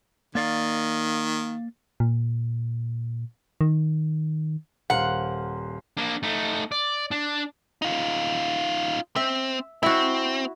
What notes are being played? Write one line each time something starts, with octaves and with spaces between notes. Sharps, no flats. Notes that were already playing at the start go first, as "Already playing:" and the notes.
D#3 A#3 D5 F5
A#2
D#3
D#1 A#4 C5 F5 F#5
A#3 D4
A3 D#4
D5
D4
D#4 F4
C4 E5
C4 E4 F#4